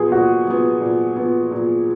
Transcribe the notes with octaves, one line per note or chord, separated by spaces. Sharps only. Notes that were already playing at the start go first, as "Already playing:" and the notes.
Already playing: A#2 F3 B3 G#4
A#2 F#4
F3 B3
A#2
F3 B3
A#2